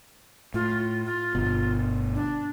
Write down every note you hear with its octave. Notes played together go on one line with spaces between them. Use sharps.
A2 F4
F4
G1 B2
D4